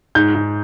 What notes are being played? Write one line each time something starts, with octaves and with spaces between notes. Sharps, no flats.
G#2 G6
G#2